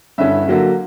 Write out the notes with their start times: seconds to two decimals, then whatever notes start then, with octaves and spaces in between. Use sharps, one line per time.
0.18 G2 D3 G3 C#4 E4 E5
0.48 D3 F#3 A#3